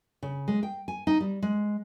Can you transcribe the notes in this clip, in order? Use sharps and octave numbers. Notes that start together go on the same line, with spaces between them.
C#3
G#3
G5
G#5
D#4
G3
G#3